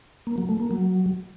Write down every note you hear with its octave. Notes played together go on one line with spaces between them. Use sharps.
A#3
F#3
A3
A#3
F#3